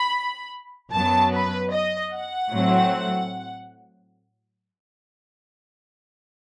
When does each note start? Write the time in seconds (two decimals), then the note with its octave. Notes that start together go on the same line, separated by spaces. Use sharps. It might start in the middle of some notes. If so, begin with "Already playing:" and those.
Already playing: B5
0.92 F#2 F#3 B3 A5
1.33 B4
1.71 D#5
2.12 F#5
2.51 A2 F#3 A3 C4